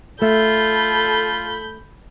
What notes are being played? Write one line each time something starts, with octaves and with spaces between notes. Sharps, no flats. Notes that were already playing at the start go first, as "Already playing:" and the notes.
A3 F4 A4 B5 G6